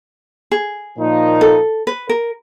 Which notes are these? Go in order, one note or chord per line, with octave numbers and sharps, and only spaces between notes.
G#4
A#2 F3 A#3 D#4
A4
B4
A#4